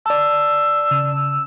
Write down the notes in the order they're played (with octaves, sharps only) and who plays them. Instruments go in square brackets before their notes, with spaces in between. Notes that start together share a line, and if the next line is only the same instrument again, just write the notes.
[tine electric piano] D5 A5 [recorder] E6
[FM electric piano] C#3